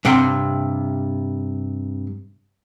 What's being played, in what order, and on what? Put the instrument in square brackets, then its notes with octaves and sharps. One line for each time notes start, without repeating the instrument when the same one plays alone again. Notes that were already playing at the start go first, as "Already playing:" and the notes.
[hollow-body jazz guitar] G2 C3 F#5 G5 C6